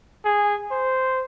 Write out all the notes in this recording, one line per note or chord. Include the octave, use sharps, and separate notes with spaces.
G#4
C5